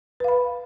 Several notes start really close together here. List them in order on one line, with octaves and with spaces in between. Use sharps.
B4 F5 B5